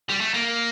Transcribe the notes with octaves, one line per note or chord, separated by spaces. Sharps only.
G3
A3
A#3